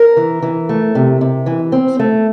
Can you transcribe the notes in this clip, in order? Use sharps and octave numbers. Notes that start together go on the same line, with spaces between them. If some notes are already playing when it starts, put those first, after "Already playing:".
Already playing: A#4
E3
E3
A3
C3
C3
E3
C4
A3